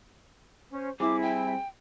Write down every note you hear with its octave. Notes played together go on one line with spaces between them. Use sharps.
C#4 C5
G3 C4 E4 G#4 D6
G5